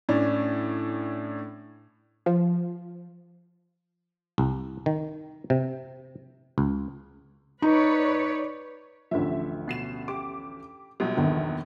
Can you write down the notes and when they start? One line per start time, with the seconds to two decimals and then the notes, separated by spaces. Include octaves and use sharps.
0.09 A2 C#4 D4
2.26 F3
4.38 C2
4.86 D#3
5.50 C3
6.58 C#2
7.62 D#4 B4 C#5 D5
9.11 A1 D2 F3 E5
9.68 B2 C7 E7
10.08 G4 D6
11.00 A#1 B2 F#3 G3
11.17 G1 E2 D#3